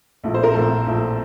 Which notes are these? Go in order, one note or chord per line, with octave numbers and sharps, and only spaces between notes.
A#1 A2 A3
C5
A#4
A#1 A2 A3 A4
A#1 A2 A3